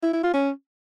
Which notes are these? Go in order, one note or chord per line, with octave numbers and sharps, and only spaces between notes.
E4
E4
F4
C#4